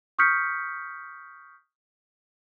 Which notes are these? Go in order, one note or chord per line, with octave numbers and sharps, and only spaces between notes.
C#6 D#6 F6 G6 B6 C#7